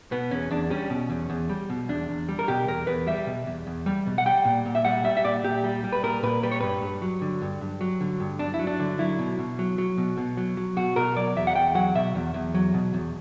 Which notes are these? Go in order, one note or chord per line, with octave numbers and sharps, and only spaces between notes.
B2 B3
E2 C#4
E2 D4
G3 C#4
B2
E2
E2
G3
B2
E2 D4
E2
G3
A#4
B2 G4
E2 A#4
E2 B4
G3 E5
B2
E2
E2
G3
B2
F#5
G3 G5
A#2
A#2
E5
G3 F#5
G3 E5
E5
A#2 D5
A#2 G4
G3
G3
B4
A#2 A#4
A#2 B4
G3 B4
C#5
G2 B4
G2
F#3
D3
G2
G2
F#3
D3
G2
G2 D4
E4
F#3
D4
D3
F#3 E4
B2
B2
F#3
F#3
B2
B2
F#3
F#3
B2 F#4
B2 A#4
F#3 D5
E2 E5
F#5
E2 G5
F#3 F#5
B2 E5
E2
E2
F#3
B2
E2